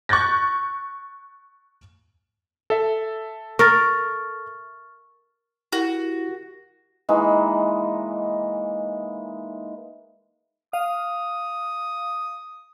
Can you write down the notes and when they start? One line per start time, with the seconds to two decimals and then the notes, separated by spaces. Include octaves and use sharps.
0.09 C#6 F#6 G6 A6 A#6
2.70 A4 E5
3.59 A#4 C#6 F6 A6
5.72 E4 F#4 G4 A#4
7.09 E3 G#3 A#3 D#4
10.73 F5 D#6